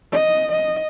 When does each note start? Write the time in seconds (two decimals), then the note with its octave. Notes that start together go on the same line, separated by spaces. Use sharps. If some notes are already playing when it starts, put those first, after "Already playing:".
0.12 D#5
0.51 D#5